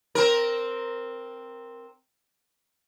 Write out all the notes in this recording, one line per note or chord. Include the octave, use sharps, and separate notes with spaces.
C4 A#4